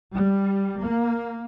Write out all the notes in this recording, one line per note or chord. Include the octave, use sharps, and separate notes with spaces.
G3
A#3